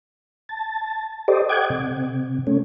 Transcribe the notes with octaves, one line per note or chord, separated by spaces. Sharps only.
A5
G4 A4 C5 D5 D#5
D#5 F#5 G5 D6 G#6
C3
A3 C#4